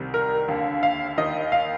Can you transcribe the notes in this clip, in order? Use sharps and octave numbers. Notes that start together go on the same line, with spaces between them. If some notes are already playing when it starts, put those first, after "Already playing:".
Already playing: C2 C3 D#3
A#4
D#2 D3
F5
D#2 D#3 D#5
F5